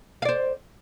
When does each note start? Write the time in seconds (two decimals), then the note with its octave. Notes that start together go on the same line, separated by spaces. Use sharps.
0.22 F5
0.25 D5
0.28 C5